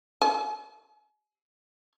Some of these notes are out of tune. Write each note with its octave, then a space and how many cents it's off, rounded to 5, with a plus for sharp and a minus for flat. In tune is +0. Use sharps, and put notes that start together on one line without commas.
G#5 +35